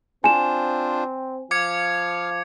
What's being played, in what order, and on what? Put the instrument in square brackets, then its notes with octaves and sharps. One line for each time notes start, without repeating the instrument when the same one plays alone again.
[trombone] C4 [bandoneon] D4 F4 C5 [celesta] G#5 E7
[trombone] F3 [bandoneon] F5 [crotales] D6 G#6 C#7